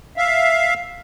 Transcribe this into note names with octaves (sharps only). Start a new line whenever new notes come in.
E5 F5